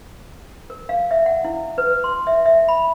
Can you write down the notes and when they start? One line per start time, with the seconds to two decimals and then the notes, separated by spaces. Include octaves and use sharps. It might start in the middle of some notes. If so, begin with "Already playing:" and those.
0.70 A#4
0.89 F5
1.11 E5
1.26 F#5
1.45 E4
1.78 B4
2.04 C6
2.27 E5
2.46 E5
2.68 B5